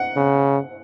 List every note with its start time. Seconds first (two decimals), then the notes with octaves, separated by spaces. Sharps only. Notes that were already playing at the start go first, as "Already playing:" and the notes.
Already playing: F#5
0.16 C#3